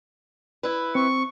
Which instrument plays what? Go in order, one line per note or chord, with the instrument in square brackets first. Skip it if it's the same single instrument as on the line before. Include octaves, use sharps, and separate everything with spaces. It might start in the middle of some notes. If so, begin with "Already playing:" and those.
[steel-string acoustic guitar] E4 B4
[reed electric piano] C4 [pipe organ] C#6